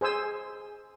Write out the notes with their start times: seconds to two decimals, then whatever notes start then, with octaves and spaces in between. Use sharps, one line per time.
0.01 G#4 C5 G#5 E6